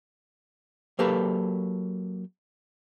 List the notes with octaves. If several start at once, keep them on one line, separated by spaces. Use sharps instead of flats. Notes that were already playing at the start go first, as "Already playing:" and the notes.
F#3 A#3 G4 A4 B4